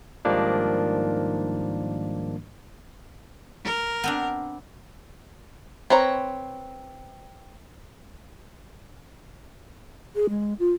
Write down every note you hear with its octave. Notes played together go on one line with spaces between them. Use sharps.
G#2 D#3 F3 G3 A#3 D4
A#4
B3 C4 D4
C4 B4 C#5 A#5
G#4
G#3
F4